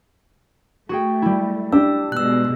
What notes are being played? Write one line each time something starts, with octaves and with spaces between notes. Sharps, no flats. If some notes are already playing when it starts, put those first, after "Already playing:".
A3 F#4 G#4 G5
G3 E4
D4 G4 E6
B2 G#3 E6 F#6